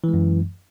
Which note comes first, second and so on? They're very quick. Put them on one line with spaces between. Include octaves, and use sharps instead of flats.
E3 G#3 F#2